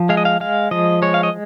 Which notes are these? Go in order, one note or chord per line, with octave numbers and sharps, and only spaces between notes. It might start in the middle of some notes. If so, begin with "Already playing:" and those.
Already playing: F3
G#3 F5
D#5
F5
G#3 F5
F3 D#5
G#3 C#5
F5
D#5